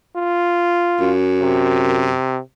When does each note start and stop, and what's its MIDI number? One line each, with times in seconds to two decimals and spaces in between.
0.16 1.11 65
1.00 2.15 42
1.41 2.39 48